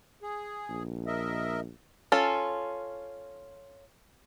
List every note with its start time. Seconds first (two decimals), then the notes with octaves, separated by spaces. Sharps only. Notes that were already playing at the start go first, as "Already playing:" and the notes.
0.22 G#4
0.70 A#1
1.07 A#4 D#5 E5
2.12 C#4 F4 A4